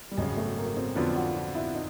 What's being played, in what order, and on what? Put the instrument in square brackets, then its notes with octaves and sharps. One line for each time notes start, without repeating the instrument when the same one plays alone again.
[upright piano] G3
[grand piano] G#1 F#2 C#3 [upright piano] G#3
[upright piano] A3
A#3
C4
[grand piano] F2 D3 F#3 B3 D4 [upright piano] F4
[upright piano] F#4
F4
E4
D#4